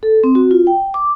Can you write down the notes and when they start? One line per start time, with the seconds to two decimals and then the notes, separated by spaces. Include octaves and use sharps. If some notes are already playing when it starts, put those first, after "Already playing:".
0.03 A4
0.24 C4
0.35 F#4
0.51 F4
0.67 G5
0.94 D6